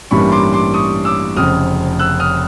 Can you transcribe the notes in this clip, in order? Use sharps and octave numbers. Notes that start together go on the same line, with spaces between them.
A1 G2 E3 G3 A#3 B5 C#6
C6 D6
C6 D6
C#6 D#6
D6 E6
F1 F2 C#3 D#6 F6
E6 F#6
D#6 F6